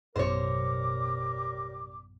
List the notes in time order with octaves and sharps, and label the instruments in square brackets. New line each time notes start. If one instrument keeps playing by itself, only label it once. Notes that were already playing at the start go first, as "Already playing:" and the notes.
[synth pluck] A1 F#2 B2 [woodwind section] G3 A#4 D6 [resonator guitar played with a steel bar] C5 C#5